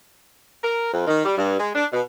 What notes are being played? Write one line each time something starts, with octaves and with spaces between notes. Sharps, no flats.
A#4
F2
D#3
G3
G2
G#3
D4
B2